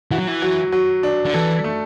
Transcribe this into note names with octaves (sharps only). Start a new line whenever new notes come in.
E3 F#4
F#3
E3
F#3
F#3
D4
D3
E3 A4
A3